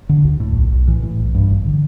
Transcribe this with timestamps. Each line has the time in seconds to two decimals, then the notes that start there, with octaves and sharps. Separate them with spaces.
0.09 D3
0.25 D2
0.40 A2
0.56 B1
0.72 B1
0.87 A2 E3
1.03 A2
1.19 B1
1.34 G2
1.49 A1
1.66 D3